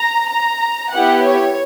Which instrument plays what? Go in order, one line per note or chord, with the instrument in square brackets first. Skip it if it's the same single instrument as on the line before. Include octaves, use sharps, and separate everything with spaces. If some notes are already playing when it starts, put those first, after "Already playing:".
Already playing: [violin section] A#5
A#5
B3 E4 G4 F#5
C#5